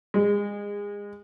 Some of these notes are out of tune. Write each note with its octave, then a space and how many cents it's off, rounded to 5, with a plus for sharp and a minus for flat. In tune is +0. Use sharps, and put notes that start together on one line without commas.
G#3 -25